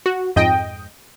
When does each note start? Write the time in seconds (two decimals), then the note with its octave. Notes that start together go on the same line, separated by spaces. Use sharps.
0.06 F#4
0.36 F2 G#2 D#5 G5